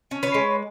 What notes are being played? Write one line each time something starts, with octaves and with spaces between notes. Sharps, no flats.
C#4
B4 C#5
G#3